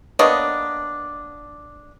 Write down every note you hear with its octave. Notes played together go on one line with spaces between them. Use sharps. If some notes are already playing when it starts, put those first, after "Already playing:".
A#3 B3 D4 C#5 D#5